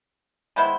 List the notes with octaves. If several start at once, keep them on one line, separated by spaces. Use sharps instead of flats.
D#3 G#3 B3 E4 C5